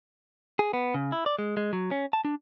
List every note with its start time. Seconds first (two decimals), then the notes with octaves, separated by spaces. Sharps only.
0.59 G#4
0.73 B3
0.94 C#3
1.12 E4
1.26 D5
1.39 G#3
1.57 G#3
1.73 F#3
1.91 C#4
2.13 A5
2.25 D4